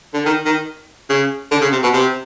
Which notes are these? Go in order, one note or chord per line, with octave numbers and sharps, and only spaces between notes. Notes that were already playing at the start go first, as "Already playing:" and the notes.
D3
D#3
D#3
C#3
D3
C#3
C3
B2
C3